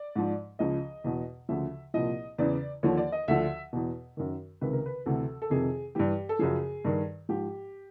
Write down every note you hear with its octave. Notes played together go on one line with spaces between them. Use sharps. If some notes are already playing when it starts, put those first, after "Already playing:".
Already playing: D5
G#2 F3
C#2 C#3 F3 D#5
E2 B2
D2 C#3 F3 E5
C2 A#2 F3 D#5
E2 C#3 E3 D5
D#2 D3 F3 C#5
D5
D#5
D2 D3 F3 E5
E2 B2
F#2 D#3
C#2 C3 D#3 B4
A#4
B4
D2 C3 E3 A4
A4
F2 C3 D#3 G#4
G2 E3 G4
A4
F#2 C#3 F3 G#4
G2 D#3
G#2 F3 G4